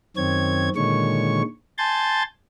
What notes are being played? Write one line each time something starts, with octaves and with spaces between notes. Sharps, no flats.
F#2 D#3 C4 C#5 G#6
A#2 D3 D#3 G#3 C#5 C#6
G#5 A5 C6 G6 A6